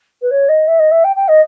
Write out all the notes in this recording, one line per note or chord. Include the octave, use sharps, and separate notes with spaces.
B4
C#5
D#5
E5
D#5
E5
G5
G5
D#5